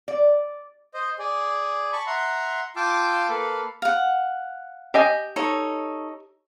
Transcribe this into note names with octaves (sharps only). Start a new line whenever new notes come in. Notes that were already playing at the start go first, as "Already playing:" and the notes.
D5
C5 D#5
G#4 D5
A5 B5 C#6
E5 F#5 A#5 C6
F4 F5 G5 A5 D6 E6
A#3 A4 B4 F5
F5 F#5
G4 D#5 G#5
D#4 A4 C#5